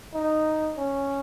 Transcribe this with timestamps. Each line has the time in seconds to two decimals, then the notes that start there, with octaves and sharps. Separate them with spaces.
0.14 D#4
0.77 C#4